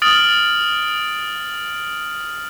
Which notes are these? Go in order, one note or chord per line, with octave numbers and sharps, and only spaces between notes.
D#6 F6 A6 D7 F#7